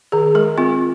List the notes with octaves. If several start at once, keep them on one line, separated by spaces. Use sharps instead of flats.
D#3 G#4
G#3 A#4
C4 F4